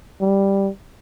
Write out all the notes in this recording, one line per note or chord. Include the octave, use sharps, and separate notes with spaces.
G3